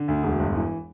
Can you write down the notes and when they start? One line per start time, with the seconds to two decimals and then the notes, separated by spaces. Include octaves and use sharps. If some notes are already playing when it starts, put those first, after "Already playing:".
Already playing: D3
0.08 D2
0.23 E1
0.39 G1
0.55 E3